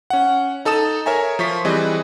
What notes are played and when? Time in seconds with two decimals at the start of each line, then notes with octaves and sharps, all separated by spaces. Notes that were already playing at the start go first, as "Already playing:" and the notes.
0.10 C#4 F#5
0.65 D#4 A4 A5 D#6 E7
1.06 A#4 C#5 E5 G#5 A#5
1.39 F3 F4 C#6 B6
1.65 E3 G3 C4 G#4 B4 D#5